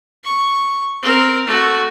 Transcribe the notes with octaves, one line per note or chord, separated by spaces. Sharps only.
C#6
C4 A#4
A3 F#4